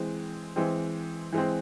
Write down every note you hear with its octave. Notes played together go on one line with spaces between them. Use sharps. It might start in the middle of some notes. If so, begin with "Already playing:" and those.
Already playing: E3 G#3 C4
E3 G#3 C4
E3 G#3 C4